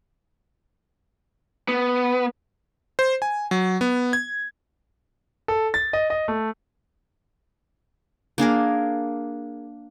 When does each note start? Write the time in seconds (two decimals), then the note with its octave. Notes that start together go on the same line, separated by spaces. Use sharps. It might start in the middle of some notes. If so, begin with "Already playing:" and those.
1.68 B3
2.99 C5
3.22 G#5
3.51 F#3
3.81 B3
4.13 G#6
5.48 A4
5.74 A6
5.93 D#5
6.10 D#5
6.28 A3
8.38 A#3 D4 G#4 A#4